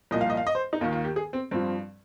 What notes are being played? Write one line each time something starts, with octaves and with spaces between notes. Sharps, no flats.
C2 A#2 F3 D#5
F5
D#5
F5
D#5
C5
D#4
D#2 D#3 F4
F4
G4
G#4
C4
G2 F3 C4